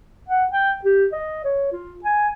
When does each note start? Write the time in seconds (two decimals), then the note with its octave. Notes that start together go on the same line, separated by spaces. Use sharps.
0.29 F#5
0.52 G5
0.85 G4
1.12 D#5
1.45 C#5
1.72 F4
2.05 G#5